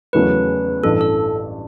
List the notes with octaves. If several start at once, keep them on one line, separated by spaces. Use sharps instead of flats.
E2 C#3 F#3 A3 E4 B4
A1 G2 E3 A4
A4